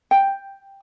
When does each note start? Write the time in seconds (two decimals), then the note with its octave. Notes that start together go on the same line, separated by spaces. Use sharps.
0.11 G5